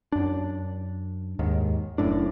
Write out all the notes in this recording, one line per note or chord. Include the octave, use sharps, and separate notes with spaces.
F#2 D4
D#2 G#2 D#3
F#1 F#2 A2 D4